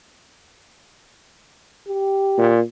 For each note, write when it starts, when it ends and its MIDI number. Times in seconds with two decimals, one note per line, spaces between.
1.88 2.52 67
2.38 2.60 46